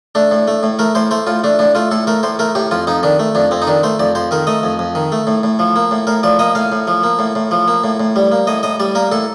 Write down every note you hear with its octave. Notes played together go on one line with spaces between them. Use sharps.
A3 D4
A2
A3
A2
A3 A#4
A2 C5
A3 C5
A2 F4
A3 D4
A2 D4
A3 F4
A2 A4
A3 A#4
A2 C5
A3 A#4
A2 G4
F2 F4
F2 D#4
D#3 D4
A3
F2 D4
F2 C4
D#4
D#3 D4
A3 C5
F2 D5
F2 C5
D#3 A#4
A3 D#5
F2
F2
D#3
A3
A2
A2
F3
A#3
A2
A2 A#4
F3 D5
A#3 D#5
A2 F5
A2
F3
A#3
A2
A2
F3
A#3
A2
A2
G3
A#3
A2 D#5
A2 D#5
G3 D5
A#3 A#4
A2 A4